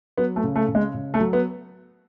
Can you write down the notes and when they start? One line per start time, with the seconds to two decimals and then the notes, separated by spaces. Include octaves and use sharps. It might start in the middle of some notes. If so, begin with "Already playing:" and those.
0.18 F#3 B3
0.36 A3
0.44 C#3
0.56 A3
0.69 C#3
0.75 G#3
0.94 C#3
1.14 A3
1.20 F#3
1.33 B3